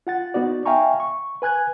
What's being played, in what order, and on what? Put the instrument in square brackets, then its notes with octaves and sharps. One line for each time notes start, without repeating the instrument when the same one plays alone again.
[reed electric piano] F4 F#5 A6
B3 D#4 F#4 D5
E5 F5 G5 G#5 A#5 C#6
C#6
B4 G#5 F#6 G#6